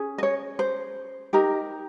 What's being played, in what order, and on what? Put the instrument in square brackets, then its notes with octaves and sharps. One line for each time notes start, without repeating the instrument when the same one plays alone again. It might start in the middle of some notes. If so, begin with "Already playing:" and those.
Already playing: [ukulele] C#4 G#4
D#5
C#5
C5
D#4 G4 A#4